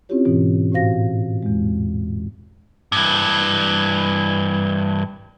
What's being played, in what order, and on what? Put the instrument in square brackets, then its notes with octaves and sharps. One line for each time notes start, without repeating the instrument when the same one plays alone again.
[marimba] C4 C#4 E4 F4 G4 C#5
G#2 B2 E3 G4
A2 F#4 C5 F5 A#6
E2 G#3
[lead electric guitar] G2 E3